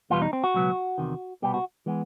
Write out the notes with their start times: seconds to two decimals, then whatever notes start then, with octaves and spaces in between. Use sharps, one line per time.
0.10 E2 B2 G3 B3 F4
0.22 D#4
0.33 C4
0.44 F#4
0.54 C#2 B2 F#3 B3
0.98 E2 C3 D#3
1.42 C2 B2 G3 B3 G4
1.54 F#4
1.86 E3 G#3 B3